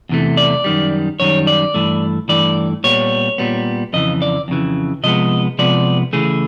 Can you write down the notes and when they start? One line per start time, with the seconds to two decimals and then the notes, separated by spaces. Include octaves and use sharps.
0.09 E2 C3 E3 A3
0.37 D5
0.64 F#2 D#3 G3
1.20 F#2 D#3 G3 C#5
1.47 D5
1.74 G2 E3 A3
2.29 G2 E3 A3 D5
2.84 A#2 G3 B3 C#5
3.38 A#2 G3 B3
3.93 F2 C#3 E3 D#5
4.22 D5
4.48 F2 C#3 E3
5.03 C3 F3 G#3 B3 D#5
5.59 C3 F3 G#3 B3 D5
6.13 C#3 E3 A3 G#4